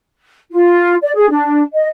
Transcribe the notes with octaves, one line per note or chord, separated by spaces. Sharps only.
F4
D5
G#4
D4
D#5